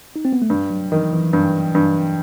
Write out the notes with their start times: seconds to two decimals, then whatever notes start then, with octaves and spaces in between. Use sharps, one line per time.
0.16 D#4
0.25 C4
0.33 B3
0.42 A3
0.50 G2 G3
0.70 F#3
0.92 D#3 E3
1.12 E3
1.33 G2
1.75 G2